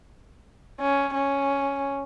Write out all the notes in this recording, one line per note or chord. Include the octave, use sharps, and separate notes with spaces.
C#4
C#4